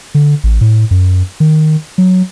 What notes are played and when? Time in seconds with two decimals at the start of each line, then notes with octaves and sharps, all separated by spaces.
0.15 D3
0.44 A1
0.61 A2
0.91 F#2
1.40 D#3
1.98 F#3